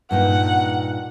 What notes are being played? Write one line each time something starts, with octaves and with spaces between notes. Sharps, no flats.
G2 A#2 D#4 F#5